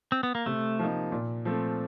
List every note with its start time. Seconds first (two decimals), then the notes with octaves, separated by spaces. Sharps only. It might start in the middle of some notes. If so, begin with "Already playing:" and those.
0.12 C4
0.23 B3
0.35 A#3
0.46 C3 A3
0.79 F3 A#3 D#4
1.12 A#2
1.45 F3 A3 C4